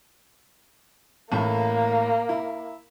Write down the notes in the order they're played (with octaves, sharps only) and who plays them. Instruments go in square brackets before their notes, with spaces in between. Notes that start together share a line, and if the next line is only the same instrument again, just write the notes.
[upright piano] A1 A2 [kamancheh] A#3
[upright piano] E4